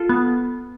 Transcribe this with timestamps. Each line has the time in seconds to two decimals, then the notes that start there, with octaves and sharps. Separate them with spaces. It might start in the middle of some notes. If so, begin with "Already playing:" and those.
Already playing: F4 A4
0.09 B3